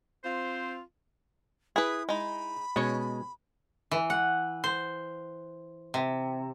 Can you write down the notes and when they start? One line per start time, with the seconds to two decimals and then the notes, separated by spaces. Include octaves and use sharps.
0.24 C4 F4 C5
1.76 E4 G#4 B4 D#6
2.09 G#3 D#4 B5
2.76 B2 G#3 C#4 C#5
3.91 E3
4.10 F#5
4.64 C5
5.94 C3